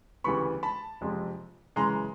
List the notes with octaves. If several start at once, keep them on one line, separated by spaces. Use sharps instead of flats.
D2 C#3 E3 G3 B3 B5 C#6
A5 B5
F#1 F2 C3 F3 G#3
F#2 C#3 E3 G#3 A#5 C6